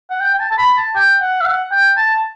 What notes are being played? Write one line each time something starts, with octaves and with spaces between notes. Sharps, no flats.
F#5
G5
G5
A5
A5
B5
A5
G5
F#5
E5
F#5
G5
A5